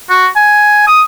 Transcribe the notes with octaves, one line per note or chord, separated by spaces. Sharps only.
F#4
G#5
D#6